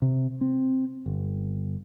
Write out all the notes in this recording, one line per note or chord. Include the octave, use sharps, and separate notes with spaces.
C3
C4
G1